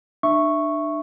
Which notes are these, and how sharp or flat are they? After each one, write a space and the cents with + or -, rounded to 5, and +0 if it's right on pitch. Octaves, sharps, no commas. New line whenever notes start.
D4 +35 E5 +5 C#6 -5